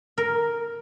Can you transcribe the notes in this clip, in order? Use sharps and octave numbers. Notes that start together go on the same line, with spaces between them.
A#4